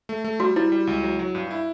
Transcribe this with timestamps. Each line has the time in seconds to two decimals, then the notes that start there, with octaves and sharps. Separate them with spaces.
0.09 A3
0.24 A3
0.40 G3 F#4
0.56 G3 E4
0.72 G3
0.87 C#2
1.03 F#3
1.19 F#3
1.35 G2
1.51 E4